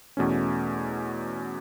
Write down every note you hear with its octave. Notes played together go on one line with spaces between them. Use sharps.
E2 B2 A3 C#4